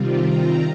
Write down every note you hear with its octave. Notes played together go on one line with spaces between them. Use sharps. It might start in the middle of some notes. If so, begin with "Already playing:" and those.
Already playing: C3 D#3 G3 C4 F4
A#5